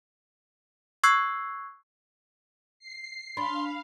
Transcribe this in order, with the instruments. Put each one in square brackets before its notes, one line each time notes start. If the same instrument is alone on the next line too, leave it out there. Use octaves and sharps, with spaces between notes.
[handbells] C#6 E6 F#6 G#6 C7
[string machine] C7
[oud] D4 [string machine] F5 [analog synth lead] B5 [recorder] C6